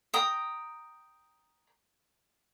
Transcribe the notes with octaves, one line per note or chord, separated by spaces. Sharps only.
G5 A#5 D#6